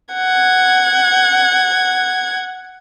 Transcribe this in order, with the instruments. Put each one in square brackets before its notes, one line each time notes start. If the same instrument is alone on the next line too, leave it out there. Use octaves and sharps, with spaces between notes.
[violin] F#5 G#6